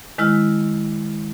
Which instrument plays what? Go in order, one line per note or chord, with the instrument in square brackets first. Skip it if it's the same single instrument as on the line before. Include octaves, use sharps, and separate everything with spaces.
[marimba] D#3 G#3 E4 F6